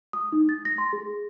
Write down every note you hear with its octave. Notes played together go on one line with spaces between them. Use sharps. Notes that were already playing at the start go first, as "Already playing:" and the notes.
D#6
D#4
A6
A#6
C6
G#4